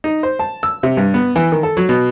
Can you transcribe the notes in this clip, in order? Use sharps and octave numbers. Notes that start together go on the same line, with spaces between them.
D#4
C5
A5
E6
C3
G2
B3
E3
D#3
A4
F#3
B2